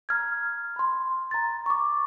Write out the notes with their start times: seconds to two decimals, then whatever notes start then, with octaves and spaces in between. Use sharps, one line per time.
0.09 A#5 F6 G#6
0.76 B5 C6
1.31 A#5 A6
1.66 C#6 D6